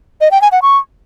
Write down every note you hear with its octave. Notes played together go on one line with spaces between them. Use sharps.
D#5
G5
G#5
F#5
C#6